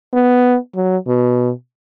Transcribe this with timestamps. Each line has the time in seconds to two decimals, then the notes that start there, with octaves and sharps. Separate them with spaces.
0.13 B3
0.75 F#3
1.07 B2